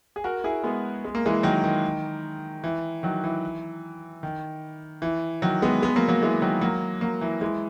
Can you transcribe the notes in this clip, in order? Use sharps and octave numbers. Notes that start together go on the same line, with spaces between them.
G#4
F#4 A#4
E4 G#4
G#3 B3
G#3
A#3
E3 G#3
D#3 F#3
D#3
E3
D#3 F#3
E3
D#3
E3
D#3 F#3
G#3 B3
G#3 B3
F#3 A#3
F#3 A#3
E3 G#3
D#3 F#3
F#3 A#3
F#3 A#3
E3
E3 G#3